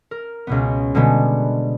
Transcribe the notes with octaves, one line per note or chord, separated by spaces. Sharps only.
A#4
C#2 B2 B3
B2 D3 G3 G#3 B3